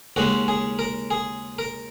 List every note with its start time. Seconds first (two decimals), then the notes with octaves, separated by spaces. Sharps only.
0.16 D#2 C#3 G#3 F#4
0.48 G#4
0.79 A#4
1.11 G#4
1.59 A#4